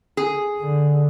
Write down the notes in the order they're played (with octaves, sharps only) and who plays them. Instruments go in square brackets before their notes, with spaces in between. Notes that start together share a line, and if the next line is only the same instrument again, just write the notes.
[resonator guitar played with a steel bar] G#4
[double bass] D3